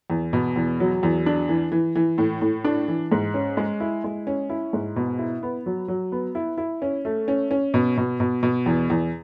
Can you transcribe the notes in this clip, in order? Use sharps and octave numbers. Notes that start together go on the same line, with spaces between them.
E2
B2
E2
F#3
E2
D4
E3
E3
E3
A2
A2
D4
E3
G#2
C#4
G#3
E4
G#3
C#4
E4
G#2
B2
E4
B3
F#3
F#3
B3
E4
E4
C#4
A3
C#4
C#4
B2
B2
B2
B2
E2
E2